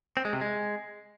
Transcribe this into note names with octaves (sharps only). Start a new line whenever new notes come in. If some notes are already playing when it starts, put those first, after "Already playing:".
C4
G#3
C3
G#3